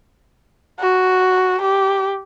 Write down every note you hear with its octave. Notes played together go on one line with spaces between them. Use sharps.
F#4
G4